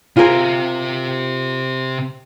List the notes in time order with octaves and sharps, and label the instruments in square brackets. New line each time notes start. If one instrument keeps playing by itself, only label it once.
[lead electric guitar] C3 C4 [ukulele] F4 G#4 A#4